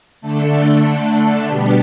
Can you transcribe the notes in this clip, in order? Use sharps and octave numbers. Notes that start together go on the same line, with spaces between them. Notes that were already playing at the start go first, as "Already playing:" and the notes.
D3 A3 D4 A4
B2 G3 B3 D4 G4